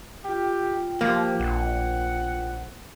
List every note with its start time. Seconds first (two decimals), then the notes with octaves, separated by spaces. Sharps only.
0.24 F4 G4 G5
1.01 F3 A#3 G4
1.40 A#1 F#5